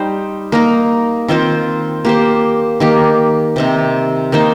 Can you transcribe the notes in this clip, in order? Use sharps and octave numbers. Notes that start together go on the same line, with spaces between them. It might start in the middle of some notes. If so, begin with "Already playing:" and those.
Already playing: G3 D#4 C5
A#3 D#4 A#4
D#3 C4 F4 C5
A#3 G4 C5
D#3 A#3 G4
C3 D#3 C4
D#3 A#3 D#4 C5